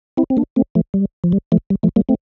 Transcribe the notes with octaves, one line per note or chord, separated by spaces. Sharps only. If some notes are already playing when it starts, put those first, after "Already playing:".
C4 E4
C4
A#3 D4
A3 C4
F3 A3
G3
F3
G3
F3 A3
G3
F3 A3
G3 A#3
A3 C4